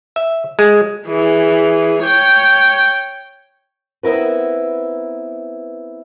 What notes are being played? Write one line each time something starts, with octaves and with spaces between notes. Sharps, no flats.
E5
G#3
E3 G#4
C#5 G5
B3 C4 E4 A#4 B4